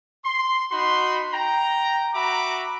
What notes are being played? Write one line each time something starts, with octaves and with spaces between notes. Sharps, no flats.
C6
D#4 F#4 B5 C6
G5 A#5
F#4 E5 A#5 B5 D6